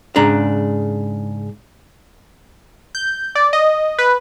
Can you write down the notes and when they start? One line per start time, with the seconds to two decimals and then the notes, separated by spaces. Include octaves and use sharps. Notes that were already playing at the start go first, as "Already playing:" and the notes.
0.16 G#2 C#3 D4 A#5
2.95 G6
3.35 D5
3.53 D#5
3.99 B4